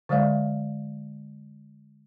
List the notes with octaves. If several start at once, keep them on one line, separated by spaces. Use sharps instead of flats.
D3 F#3 G#3 D5 F5